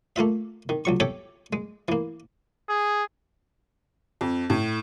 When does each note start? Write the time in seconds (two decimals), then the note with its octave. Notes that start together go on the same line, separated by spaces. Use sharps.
0.16 A3 A#3 F4 E5
0.69 D#3
0.85 C#2 F#3 C#6
1.00 G4 A4 C#5 E5 G5
1.53 G#3
1.88 E3 A#3
2.69 G#4
4.21 F2
4.50 A2